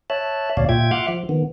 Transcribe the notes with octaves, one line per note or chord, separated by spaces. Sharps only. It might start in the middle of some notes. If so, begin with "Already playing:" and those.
C#5 E5 A5 F#6
D2 B2 C#5 D5 F5
A#2 F4 E5 G5 G#6
E5 F#5 C6 D6 F6 F#6
F3
D#3 B3